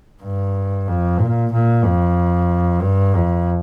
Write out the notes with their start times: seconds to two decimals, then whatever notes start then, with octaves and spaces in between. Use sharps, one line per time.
0.22 G2
0.88 F2
1.20 A#2
1.52 A#2
1.85 F2
2.82 G2
3.15 F2